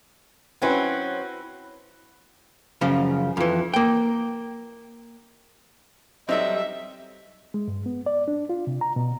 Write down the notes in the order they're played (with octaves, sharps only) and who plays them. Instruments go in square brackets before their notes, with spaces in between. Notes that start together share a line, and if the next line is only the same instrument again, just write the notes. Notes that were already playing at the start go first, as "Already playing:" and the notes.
[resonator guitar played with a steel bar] F#3 C4 C#4 [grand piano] E4 F#4 B4
[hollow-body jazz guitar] F#2 C#3 F3
F2 E3
A#3 G5
[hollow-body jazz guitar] F#3 G3 A4 [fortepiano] C4 D#4 [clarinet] D#5 [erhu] E5
[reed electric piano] G#3
G2
B3
D5
D4
F4
C3
A#5
B2